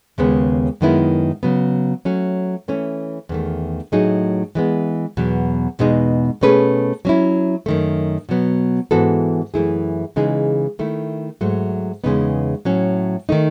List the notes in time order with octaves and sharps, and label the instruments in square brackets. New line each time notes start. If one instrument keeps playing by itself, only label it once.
[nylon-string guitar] D#2 C#3 G#3 B3
F#2 D#3 G#3 B3 E4
C#3 F#3 B3
F#3 A3 C#4
E3 A3 C#4
E2 D#3 A3
A2 F#3 A3 D#4 G#4
E3 G#3 B3
E2 B2 F#3
E2 B2 G#3 D#4 G#4
B2 A3 C#4 G#4 B4
F#3 C#4 E4
F#2 D#3 A3
B2 F#3 B3
G#2 E3 B3 F#4 A4
F#2 E3 A3 E4 G#4
C#3 E3 G#3 D#4 G#4
D#3 A3 E4
G#2 F#3 A3
E2 C#3 G#3 B3 D#4
A2 F#3 C#4
D#3 A3 D#4